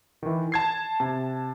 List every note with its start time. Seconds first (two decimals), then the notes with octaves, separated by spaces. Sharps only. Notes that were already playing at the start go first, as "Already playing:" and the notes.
0.23 D#3 E3
0.52 A5 G#6 C7
1.00 C3 A5